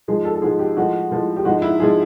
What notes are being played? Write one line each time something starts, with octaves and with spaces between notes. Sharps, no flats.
G#2 F3 G#3 G#4
A4
A4
G#2 F3 G#3 G#4
G4
A2 F3 G#3 F#4
A2 F3 G#3
G4
G#2 F3 G#3 F#4
E4
G#2 F3 G#3 G#4